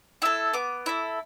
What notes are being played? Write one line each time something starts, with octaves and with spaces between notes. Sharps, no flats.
E4 A4 E6
B3 D6
E4 A4